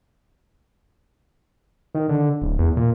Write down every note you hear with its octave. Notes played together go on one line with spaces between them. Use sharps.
D#3
D3
D1
E2
A#2